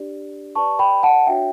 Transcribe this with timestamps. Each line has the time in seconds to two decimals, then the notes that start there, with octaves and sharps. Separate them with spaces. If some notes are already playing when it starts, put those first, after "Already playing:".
Already playing: D4 G4 D5
0.55 G4 B4 D5 A5 C#6
0.79 G5 B5
1.03 F#5 A5
1.27 D4 F#4 C#5 E5 G5